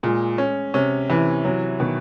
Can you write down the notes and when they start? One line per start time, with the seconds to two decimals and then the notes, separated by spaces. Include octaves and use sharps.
0.03 A#2 G#3
0.38 C#4
0.74 C3 C#4
1.09 C3 E3
1.45 C3 F#3
1.80 B2 D#3